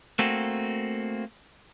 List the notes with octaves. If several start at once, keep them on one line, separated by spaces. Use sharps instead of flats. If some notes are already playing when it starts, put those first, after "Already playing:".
A3 A#3 C4 F#4